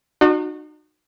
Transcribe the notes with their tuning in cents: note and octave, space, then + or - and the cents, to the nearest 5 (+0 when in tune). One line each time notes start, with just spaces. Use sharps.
D#4 -40 F#4 -20